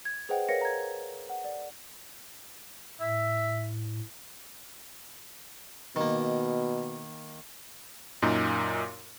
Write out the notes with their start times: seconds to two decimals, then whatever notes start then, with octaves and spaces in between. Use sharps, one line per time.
0.05 G#6
0.29 G#4 B4 C5 D#5 F#5 G5
0.49 A#4 B4 C#5 F5 A#6 C#7
0.61 A#5 G#6
1.29 F#5
1.44 D5
3.01 A2 E5
5.96 B2 D#3 A#3
8.22 F#2 A#2 D#4